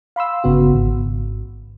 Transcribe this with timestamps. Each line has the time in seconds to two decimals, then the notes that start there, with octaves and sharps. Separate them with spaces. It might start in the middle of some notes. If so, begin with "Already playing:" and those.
0.16 F5 B5 C6 E6
0.44 G1 C#3 B3 F#4
0.74 G#1